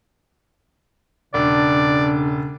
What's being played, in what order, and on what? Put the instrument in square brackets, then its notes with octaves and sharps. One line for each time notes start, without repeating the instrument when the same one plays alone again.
[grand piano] E1 [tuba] C#3 [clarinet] D4 [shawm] D5